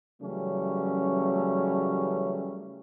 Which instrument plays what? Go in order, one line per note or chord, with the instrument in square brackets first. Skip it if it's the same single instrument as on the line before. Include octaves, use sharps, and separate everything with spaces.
[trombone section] C#3 E3 F#3 G3 A3 C#4